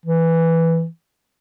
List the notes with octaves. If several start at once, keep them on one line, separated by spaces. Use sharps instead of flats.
E3